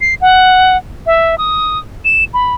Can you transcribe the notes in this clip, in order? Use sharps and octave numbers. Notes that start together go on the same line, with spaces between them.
C7
F#5
E5
D#6
E7
B5